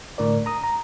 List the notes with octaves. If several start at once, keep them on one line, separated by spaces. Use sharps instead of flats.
A2 D3 A#4 D5
A#5 D#6
A#5